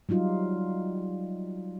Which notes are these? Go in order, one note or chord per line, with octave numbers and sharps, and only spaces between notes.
F#3 G3 D#4 F4